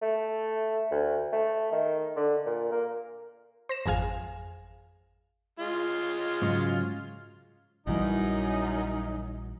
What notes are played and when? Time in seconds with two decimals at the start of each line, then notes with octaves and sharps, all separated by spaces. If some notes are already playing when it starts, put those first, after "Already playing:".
0.02 A3
0.91 D2
1.32 A3
1.72 D#3
2.17 D3
2.46 A#2
2.72 A#3
3.69 C5 A#6 E7
3.86 G#1 F2 G#4 F5 G#5
5.59 G#3 F4
6.42 G#2 C#3 F#3
7.87 A#1 F#2 E3 G3 D#4